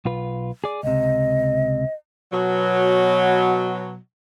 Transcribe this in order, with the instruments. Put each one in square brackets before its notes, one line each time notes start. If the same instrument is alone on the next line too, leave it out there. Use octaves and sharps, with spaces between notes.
[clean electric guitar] B1 F4 B4
G#4 D5
[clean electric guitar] C#2 C3 [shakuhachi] D#5
[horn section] B2 F#3